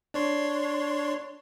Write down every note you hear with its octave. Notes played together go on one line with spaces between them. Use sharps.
D4 C#5 C6